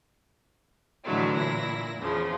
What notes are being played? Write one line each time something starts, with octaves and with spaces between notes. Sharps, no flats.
A2 D3 E3 F#3 G#3 A3
A#2 E4 A#6
E2 C#3 F3